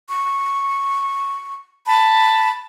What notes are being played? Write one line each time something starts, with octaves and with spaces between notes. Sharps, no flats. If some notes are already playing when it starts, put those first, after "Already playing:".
C#6
A5 B5